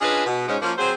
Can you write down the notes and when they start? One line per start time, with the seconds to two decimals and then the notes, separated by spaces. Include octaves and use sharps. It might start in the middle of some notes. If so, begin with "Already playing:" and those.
0.01 C#4 D4 F4 G#4 B4 D#5
0.26 B2
0.48 G#2 G#3 C#4
0.62 F3 A#3 C#4
0.78 F#3 C4 G#4 C5